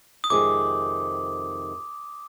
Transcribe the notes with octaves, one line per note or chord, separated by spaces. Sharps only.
D#6
F2 C3 D#3 G#3 D6